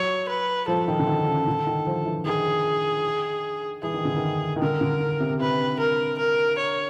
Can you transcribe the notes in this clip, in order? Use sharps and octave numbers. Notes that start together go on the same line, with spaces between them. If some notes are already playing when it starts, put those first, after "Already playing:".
Already playing: F#3 C#5
B4
F3 A4
D#3
D3
D#3
C#3
D3
D#3
F3
E3
D#3 G#4
E3 G#4
D#3
D3
D#3
D#3
D3 A#4
D3
C3
C3 B4
A#4
A#4
C#5